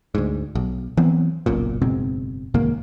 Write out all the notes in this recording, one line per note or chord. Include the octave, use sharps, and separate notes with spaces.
D2 G#2
B1
E3 F#3 B3 C4
F#1 B1 F#2 A#2
F#1 G#2 B2 C4
C2 G#2 D#3 A#3